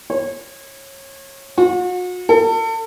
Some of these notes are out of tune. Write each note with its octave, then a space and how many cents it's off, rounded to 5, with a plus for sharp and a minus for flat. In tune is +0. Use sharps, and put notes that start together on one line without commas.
C#5 -30
F#4 -40
A4 +35